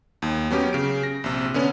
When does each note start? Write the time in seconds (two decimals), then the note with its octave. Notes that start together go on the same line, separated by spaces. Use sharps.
0.22 D#2
0.51 F#3 B3 C#4 G4
0.73 C#3 D7
1.03 A#6
1.24 A#1 C3
1.54 D3 B3 C#4